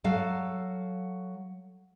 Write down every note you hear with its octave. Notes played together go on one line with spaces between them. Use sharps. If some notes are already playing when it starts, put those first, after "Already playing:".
F#3 A4 F5